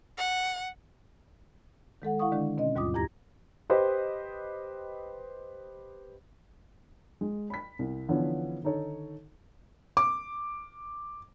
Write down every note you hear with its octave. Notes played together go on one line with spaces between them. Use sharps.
F#5
D#3 G#3 A4 F#5
E4 F5 F#5 C#6 D#6
D3 D#3 G#3 D4
B2 C4 C#4 D#5
D#2 G#2 G3 F4 D6 D#6
E2 E4 G4 A#5 G#6 A#6
G4 B4 C5 D#5
G#3
B5 B6
C2
D3 E3 F3 B3 C#4
D3 D#3 D#4 A4 C#5
D6